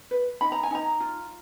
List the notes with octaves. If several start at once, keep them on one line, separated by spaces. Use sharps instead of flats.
B4
D#4 B5
A#5
G#5
D#4 A#5
F4